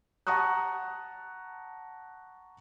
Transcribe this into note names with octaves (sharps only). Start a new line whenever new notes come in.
F#5 A5 A#5 C#6 D#6 F#6